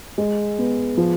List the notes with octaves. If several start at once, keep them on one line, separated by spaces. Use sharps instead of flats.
G#3
B3
F3